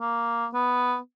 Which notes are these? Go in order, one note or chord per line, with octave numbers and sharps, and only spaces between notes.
A#3
B3